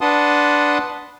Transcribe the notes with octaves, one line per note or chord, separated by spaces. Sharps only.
D4 B4 F#5 A5 C6 D#6